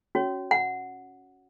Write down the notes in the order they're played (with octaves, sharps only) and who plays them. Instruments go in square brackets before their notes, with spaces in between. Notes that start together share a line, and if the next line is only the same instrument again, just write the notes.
[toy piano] C#4 F#4 C#5
F#5